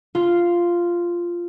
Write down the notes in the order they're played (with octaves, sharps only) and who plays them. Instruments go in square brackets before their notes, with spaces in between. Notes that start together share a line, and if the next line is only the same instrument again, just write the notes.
[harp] F4